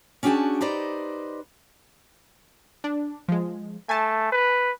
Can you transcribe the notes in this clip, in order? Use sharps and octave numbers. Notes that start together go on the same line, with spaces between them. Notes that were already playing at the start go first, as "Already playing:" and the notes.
C#4 D4 F#4 G#4 G5 A5
D#4 G4 B4 C5 D5 D#5
D4
F3 G#3
A3 G#5 A5
B4